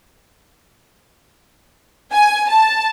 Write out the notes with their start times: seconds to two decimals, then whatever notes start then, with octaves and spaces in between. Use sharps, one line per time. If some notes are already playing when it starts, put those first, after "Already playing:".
2.13 G#5
2.50 A5